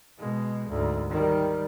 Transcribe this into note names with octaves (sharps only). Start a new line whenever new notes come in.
B2 G#3
D2 G#2
D#3 G3